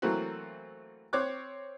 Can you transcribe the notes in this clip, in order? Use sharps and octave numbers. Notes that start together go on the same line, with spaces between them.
E3 F#3 A3 A#3 C4 F#4
C4 C#5 D6 F#6